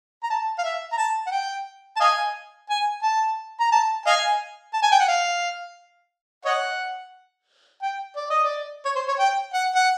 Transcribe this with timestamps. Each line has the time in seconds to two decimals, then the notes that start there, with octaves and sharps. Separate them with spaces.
0.23 A#5
0.30 A5
0.59 F5
0.64 E5
0.92 A#5
0.98 A5
1.27 F#5
1.32 G5
1.96 A5
2.00 D#5 F5 G#5
2.70 G#5
3.03 A5
3.60 A#5
3.72 A5
4.06 D#5 F5 G#5
4.74 A5
4.83 G#5
4.92 G5
4.99 F#5
5.08 F5
6.45 C#5 D#5 F#5
7.82 G5
8.16 D5
8.30 D#5
8.44 D5
8.85 C#5
8.96 C5
9.08 C#5
9.19 G5
9.54 F#5
9.75 F#5